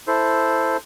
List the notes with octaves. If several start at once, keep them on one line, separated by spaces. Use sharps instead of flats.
E4 A4 C5